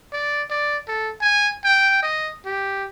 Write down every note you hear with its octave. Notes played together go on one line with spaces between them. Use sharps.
D5
D5
A4
G#5
G5
D#5
G4